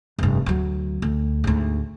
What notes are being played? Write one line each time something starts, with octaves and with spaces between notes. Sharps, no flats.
F1 G2
D2 F#3
D2
D2 G#2